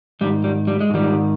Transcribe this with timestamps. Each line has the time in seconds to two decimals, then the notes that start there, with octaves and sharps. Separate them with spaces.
0.21 G#2 D#3 G3
0.44 G3
0.67 G3
0.81 G#3
0.90 G#2 D#3 G3